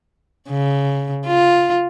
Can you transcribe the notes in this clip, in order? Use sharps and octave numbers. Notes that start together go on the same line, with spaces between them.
C#3
F4